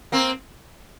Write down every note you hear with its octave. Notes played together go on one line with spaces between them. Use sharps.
A#3 C4